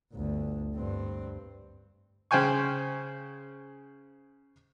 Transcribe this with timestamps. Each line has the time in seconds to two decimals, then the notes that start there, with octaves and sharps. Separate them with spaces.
0.12 G1 D2
0.76 G2 C4
2.31 C#3 C5 G5 G#5 C#6